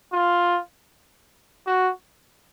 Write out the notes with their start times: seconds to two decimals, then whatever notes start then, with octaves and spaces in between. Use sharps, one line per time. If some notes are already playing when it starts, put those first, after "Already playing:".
0.13 F4
1.67 F#4